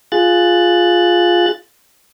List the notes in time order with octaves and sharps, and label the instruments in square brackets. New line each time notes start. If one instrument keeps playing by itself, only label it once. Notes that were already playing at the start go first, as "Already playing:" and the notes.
[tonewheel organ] F4 G#4 F#6 A6